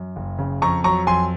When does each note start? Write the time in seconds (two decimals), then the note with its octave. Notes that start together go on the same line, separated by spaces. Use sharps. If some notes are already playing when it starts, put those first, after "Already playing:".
Already playing: F#2
0.16 F#1
0.39 C#3
0.62 F2 A#5 C#6
0.84 F#3 A#5 C#6
1.07 F2 G#5 C6